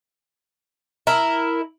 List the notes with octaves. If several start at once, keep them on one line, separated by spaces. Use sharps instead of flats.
E4 A#4